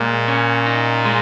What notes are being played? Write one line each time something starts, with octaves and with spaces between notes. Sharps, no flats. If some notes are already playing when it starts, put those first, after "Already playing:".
Already playing: A#2 G#3
C#4
D#4
G#3